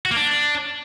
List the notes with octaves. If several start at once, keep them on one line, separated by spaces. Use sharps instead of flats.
F#4
A#3
D4